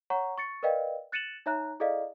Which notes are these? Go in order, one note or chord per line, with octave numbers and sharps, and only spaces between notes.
C#5 F#5 A#5 C#6
C#6 A6 C#7
A#4 B4 D5 D#5 F5 G5
F#6 A6 C#7 D#7 E7 F#7
D#4 C#5 E5 A#5 F#6
E4 G#4 A4 D5 D#5 F5